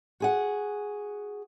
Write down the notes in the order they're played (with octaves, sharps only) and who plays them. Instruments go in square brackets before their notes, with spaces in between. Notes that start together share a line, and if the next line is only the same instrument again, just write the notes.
[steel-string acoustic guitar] F#4 G#4 F#5